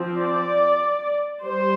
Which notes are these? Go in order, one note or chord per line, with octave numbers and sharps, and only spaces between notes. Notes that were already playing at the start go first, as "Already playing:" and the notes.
Already playing: F3 C4
D5
G3 C5